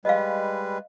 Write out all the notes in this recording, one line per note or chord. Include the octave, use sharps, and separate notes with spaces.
G3 G#3 B4 D#5 F5